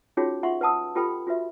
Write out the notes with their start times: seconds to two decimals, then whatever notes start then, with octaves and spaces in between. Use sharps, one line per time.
0.17 C#4 D#4 F4 F#4 G#4 C#5
0.43 F4 E5 F#5 C6 C#6
0.61 B4 F#5 A5 D#6 E6
0.95 F4 G4 A4 B4 G5 B5
1.27 F4 F#4 B4 E5